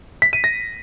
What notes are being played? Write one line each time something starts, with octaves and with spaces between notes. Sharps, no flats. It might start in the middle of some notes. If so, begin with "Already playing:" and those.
B6
D#7
A#6